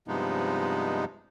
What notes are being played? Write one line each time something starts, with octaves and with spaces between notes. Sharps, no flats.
G2 C3 F3 G#3 B3 D#4